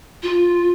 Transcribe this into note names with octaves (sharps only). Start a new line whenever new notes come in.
F4